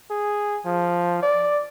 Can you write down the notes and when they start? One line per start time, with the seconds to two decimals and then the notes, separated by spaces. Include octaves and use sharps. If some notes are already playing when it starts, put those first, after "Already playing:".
0.10 G#4
0.65 F3
1.23 D5